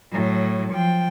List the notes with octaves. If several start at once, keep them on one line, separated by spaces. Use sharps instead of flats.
A2 F#3
F3 G5